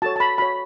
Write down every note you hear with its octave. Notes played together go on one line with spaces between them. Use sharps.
F#4 A4 C#5 A5
A5
B5
F#4 C#5 B5